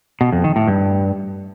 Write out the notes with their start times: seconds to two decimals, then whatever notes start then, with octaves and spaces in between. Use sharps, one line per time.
0.21 B2
0.32 F2
0.44 D#3
0.56 A2
0.68 G2